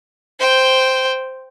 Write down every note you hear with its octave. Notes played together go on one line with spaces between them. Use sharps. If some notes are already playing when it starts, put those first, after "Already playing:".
C5 G5